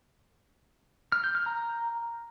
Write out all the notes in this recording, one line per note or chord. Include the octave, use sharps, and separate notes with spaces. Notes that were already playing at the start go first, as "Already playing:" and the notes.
F6
G6
F6
A#5